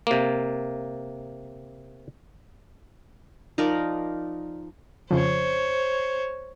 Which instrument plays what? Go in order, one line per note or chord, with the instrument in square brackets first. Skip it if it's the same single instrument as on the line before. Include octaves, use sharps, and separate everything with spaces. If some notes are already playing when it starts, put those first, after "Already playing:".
[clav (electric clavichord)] C3 A#3
[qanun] F3 D#4 A#4 D5
[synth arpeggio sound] F2 C#3 F3 [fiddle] C5 C#5